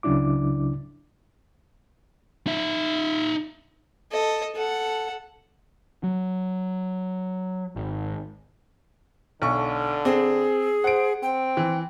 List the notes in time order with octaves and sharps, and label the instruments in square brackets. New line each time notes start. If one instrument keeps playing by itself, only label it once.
[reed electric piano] C#2 C#3 F#3 D4 E4 D6
[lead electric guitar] D#4 E5
[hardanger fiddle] A4 D#5
A4 F#5
[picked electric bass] F#3
G#1
[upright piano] B1 C#6 [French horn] D3
[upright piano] C4 [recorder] G#4
[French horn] C5 [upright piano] F#5 D7
[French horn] C4 [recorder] G5
[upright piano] E3